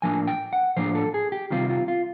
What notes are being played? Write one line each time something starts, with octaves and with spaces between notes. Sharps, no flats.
A2 F3 A#3 D4 G#5
G5
F#5
A2 F3 A#3 D4 C5
A4
G#4
G4
C3 D#3 G3 C4 F4
F4
F4